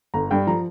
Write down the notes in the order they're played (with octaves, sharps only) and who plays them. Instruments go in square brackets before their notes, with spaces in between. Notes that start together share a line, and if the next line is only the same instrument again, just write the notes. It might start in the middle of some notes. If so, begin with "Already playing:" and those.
[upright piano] G1 A#5
G2 G5
F3 A#5